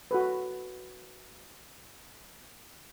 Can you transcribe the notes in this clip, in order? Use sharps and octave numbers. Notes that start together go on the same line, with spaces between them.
F#4 A4 B4